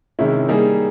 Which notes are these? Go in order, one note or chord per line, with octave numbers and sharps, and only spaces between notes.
C3 D#3 G#3 C#4 E4
G3 A#3 D#4 G#4